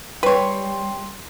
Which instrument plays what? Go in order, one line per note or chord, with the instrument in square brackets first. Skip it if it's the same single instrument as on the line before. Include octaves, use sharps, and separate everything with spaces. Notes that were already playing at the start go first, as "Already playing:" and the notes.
[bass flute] G3 [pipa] B4 C#5 [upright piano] G5 C6